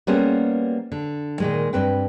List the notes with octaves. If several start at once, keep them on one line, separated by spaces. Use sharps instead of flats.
G3 A#3 B3 C#4 G#4 C5
D3
A#2 D#3 G#3
G2 C4 B4 G5